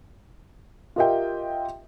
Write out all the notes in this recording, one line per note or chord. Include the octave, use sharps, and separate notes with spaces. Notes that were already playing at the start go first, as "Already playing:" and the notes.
F4 G4 A#4 D#5 E5 G5